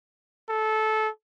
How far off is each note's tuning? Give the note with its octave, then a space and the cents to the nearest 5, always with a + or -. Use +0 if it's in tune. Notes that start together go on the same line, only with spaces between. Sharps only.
A4 -20